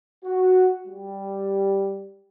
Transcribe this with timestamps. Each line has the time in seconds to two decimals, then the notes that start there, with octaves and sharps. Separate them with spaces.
0.25 F#4
0.87 G3